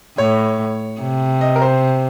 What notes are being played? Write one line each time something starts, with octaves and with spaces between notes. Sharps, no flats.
A2 C#5
C3
D#5
A#4
C5